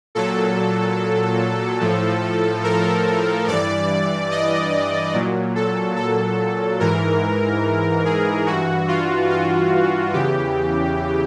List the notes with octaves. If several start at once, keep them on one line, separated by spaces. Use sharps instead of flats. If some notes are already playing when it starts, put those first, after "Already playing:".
A#2 F#3 A4
A2 F3
A#4
G2 E3 D5
D#5
A#2 F#3
A4
A4
G#2 E3 A#4
G#4
G2 E3 F#4
F4
F4
E2 C#3 E3 G4